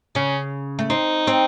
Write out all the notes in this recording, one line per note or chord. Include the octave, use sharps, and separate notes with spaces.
C#3 C#4
A3
C4 D#4
C4